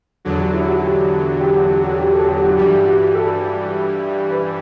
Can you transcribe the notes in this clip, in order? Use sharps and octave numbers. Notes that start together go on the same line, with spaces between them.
E2 D3 F#3
F#4
E4
F#4
G4
G4
F#4
F#4
F#4
G4
A4
G4
F#4
G2 E3 G3 G4
F#4
A4
B4